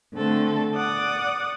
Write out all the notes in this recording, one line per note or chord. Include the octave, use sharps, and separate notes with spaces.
D3 A3 C4 A4
D5 F#5 D6 D#6